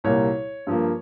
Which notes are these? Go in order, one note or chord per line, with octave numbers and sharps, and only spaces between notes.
C2 A#2 G3 A#3 C#5
G2 F3 A#3